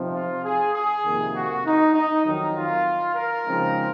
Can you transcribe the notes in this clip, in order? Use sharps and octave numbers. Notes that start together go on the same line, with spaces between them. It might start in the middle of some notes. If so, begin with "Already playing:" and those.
Already playing: C3 F3 C4 D#4
F4
G#4
G#4
F2 C3 D#3 A#3
F#4
D#4
D#4
F2 D#3 F#3 D#4
F4
A#4
C#3 F3 G#3 C4 D#4